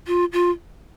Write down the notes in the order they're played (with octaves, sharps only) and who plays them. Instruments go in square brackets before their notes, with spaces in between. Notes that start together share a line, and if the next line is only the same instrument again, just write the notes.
[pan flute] F4
F4